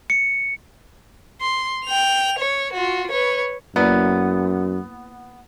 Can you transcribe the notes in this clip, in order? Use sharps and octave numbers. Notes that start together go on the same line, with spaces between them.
C#7
C6
G5 F7
C#5
F4 F#4
B4 C#5
F#2 A#3 B3 E4 D5